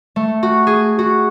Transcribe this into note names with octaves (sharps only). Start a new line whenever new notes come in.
A3
F#4
G#4
F#4